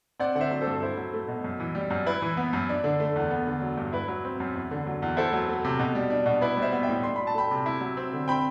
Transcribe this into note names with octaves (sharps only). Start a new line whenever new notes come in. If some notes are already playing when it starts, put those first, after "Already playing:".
C4 D5 F#5
D3 C5 E5 F#5
F#3
A4 C5
G2
E4 A4 C5
F#3
A3
B2
F#2
E3
G3
F#2
E4 B4
E3
B3
F#2
D4
D3
A3
E2
B3
D3
F#3
G2
E4 B4
F#3
C4
F#2
E2
D3
F#3
E2
E4 A4 C5
F#3
A3
C3
B2
G3
D4
B2
E4 B4 D5
G3 C5 E5
B3
E5 G5
A2
D4 C6
F#3 B5
A5
A3 G5 B5
C3
E4
F#3
C4
D3
C4 G5 B5